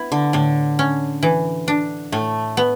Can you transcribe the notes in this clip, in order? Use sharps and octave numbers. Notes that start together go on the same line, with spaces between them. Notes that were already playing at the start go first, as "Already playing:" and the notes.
Already playing: B3 E4
D3
A2 D3
C#4
E3
D4
A2 A3
B3